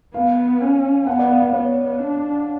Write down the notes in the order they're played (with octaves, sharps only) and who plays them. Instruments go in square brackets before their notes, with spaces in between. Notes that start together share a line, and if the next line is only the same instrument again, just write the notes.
[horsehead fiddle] B3 [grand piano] F5
[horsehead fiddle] C#4
[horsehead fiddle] B3 [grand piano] F#5
[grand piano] D5
F5
F5
[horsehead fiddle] B3 [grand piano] C#5
[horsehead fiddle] D4